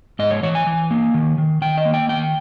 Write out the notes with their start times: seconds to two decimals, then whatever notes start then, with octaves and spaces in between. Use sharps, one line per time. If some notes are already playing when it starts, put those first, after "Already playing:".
0.19 G#2 D#5
0.31 C#5
0.43 E3 C#5
0.55 G#5
0.67 E3
0.91 A#3
1.14 D#3
1.38 D#3
1.62 D#3 G5
1.78 D#5
1.85 A#3
1.94 G5
2.09 D#3 G5